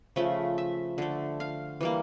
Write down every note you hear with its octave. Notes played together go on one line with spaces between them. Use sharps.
C#3 F3 A3 E5
E5
D3 A3
F5
E3 G3 A#3